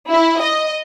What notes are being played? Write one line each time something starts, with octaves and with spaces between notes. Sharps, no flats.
E4
D#5